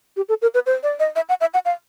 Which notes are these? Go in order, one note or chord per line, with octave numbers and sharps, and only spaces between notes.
G4
A4
A#4
B4
C5
D5
D#5
E5
F#5
E5
F#5
F5